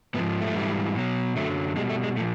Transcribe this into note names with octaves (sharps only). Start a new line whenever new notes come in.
G#2 F3 B3
A3
G#2 E3 G3
B2 F#3
F#2 D3 F#3 A3
B2 G3 G#3
A3
G#3
A#2 F3 A3